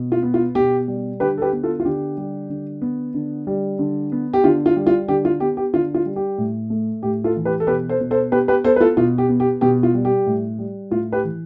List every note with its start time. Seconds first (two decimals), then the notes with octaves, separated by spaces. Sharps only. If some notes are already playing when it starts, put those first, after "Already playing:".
Already playing: B2
0.12 F4
0.23 B3
0.34 F4
0.55 B2 G4
0.88 G3
1.20 D3 G4 B4
1.38 A4
1.42 G4 B4
1.53 B3
1.63 F4 A4
1.80 F4
1.85 D3 G4
2.17 G3
2.50 D3
2.82 B3
3.14 D3
3.47 G3
3.79 D3
4.12 B3
4.33 G4
4.44 D3 F4
4.66 F4
4.76 G3
4.87 F4
5.08 D3 G4
5.25 F4
5.40 B3 G4
5.57 G4
5.74 D3 F4
5.94 F4
6.06 G3
6.16 G4
6.38 A2
6.70 A3
7.03 A2 G4
7.24 F4 A4
7.36 E3
7.45 G4 B4
7.60 A4
7.67 B2 G4 B4
7.89 A4 C5
8.00 B2
8.11 A4 C5
8.32 B3 G4 B4
8.48 G4 B4
8.64 B3 A4 C5
8.76 B4
8.80 F4 A4
8.97 B2 F4
9.18 G4
9.29 B3
9.40 G4
9.61 B2 G4
9.83 F4
9.94 G3
10.05 G4
10.26 A2
10.59 G3
10.91 A2 F4
11.12 G4 B4
11.24 E3